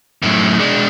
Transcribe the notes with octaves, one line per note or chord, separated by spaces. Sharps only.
F#2 A2
G#3 D4